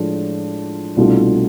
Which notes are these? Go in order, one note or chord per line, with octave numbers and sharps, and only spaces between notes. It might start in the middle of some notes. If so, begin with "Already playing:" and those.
Already playing: A2 F3 G#3 D4 F4
C2 B2 A3 D4 F4